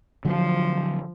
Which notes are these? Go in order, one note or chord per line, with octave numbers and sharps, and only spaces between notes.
D3 F3 F#3